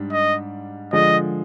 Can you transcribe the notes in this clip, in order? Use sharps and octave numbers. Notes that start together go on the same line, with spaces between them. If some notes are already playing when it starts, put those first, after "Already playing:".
Already playing: G#2 G3 D4
D#5
D3 F3 G#3 D#5